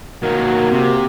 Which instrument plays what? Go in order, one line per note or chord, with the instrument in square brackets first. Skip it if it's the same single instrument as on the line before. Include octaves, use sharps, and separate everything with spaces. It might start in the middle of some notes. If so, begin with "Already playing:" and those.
[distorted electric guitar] D#3 F#3 [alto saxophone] A#3 [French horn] F#4
[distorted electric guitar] C3